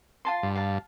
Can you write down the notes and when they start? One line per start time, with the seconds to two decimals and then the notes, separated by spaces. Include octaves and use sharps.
0.25 F4 A5 C6
0.43 G2
0.55 F5 A5